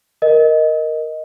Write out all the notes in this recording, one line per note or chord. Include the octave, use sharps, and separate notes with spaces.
A#4 D#5